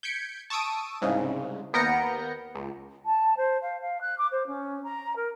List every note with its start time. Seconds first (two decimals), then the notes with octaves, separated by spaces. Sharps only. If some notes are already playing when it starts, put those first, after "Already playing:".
0.03 G6 G#6 B6 C#7 D7
0.50 A5 C#6 D#6 E6 D7 D#7
1.01 C2 G#2 C#3
1.73 D#2 B3 A#4 G6 A#6 C#7
2.55 C#2
3.05 A5
3.36 C5
3.61 F5
3.81 F5
4.01 F#6
4.18 D6
4.31 C5
4.46 C#4
4.83 A#5
5.15 A#4